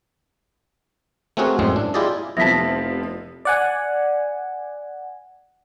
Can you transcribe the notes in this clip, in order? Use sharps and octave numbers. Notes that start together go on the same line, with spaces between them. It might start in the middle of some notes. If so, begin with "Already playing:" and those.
A3 C4 C#4 F#4 G#4 A#4
F#2 A2 G#3 C4
D4
E4 F4 G4 G#4 D5 D#5
F1 C3 F3 B3 E4 A5 A#6 B6
D5 F#5 G#5